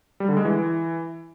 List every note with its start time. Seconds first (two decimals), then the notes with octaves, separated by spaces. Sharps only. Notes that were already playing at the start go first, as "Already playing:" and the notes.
0.20 G3
0.28 D3
0.37 G#3
0.45 E3